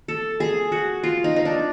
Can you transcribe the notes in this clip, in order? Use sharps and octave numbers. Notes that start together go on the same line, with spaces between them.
A4
G#4
F#4
F4
D#4
D#4
D4